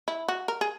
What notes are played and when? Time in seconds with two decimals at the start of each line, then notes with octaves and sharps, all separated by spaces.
0.08 E4
0.28 F#4
0.48 A#4
0.61 G#4